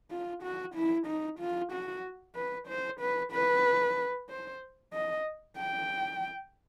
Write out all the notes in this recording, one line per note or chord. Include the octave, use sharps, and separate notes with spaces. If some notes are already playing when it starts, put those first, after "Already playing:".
F4
F#4
E4
D#4
F4
F#4
B4
C5
B4
B4
C5
D#5
G5